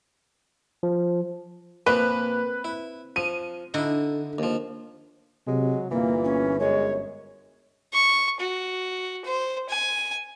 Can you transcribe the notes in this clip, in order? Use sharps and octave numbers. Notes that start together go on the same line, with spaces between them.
F3
A#2 F3 C4 B4
E4
F3 D#7
D3 D#4 E4
D#2 F3
C3 F#3 G#3
G1 A#2 E3 A#3
C#4
F#2 G#3 C#5
C#6
F#4
C5
G#5